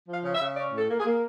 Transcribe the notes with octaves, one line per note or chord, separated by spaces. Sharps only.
F3 F5
C#3
E5
C#3
C#4 D5
A2
A4
A#3
G#4
A#3